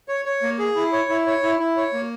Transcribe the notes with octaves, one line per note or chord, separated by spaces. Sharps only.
C#5
C#5
A#3
G#4
E4
C#5
E4
C#5
E4
E4
C#5
A#3